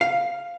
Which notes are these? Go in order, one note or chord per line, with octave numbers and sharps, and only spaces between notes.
F5